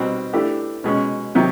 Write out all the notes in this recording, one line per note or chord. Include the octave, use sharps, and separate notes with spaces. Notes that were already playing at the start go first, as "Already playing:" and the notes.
Already playing: B2 G3 C4 D#4 F#4
E3 A3 D4 G4
B2 G#3 C#4
C3 D#3 F#3